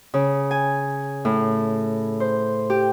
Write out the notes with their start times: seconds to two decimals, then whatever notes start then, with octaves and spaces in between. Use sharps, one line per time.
0.14 C#3
0.51 G#5
1.25 A2
2.20 C5
2.70 G4